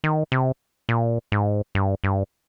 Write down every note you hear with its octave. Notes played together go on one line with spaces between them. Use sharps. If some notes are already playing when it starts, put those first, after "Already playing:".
D#3
C3
A#2
G#2
G2
G2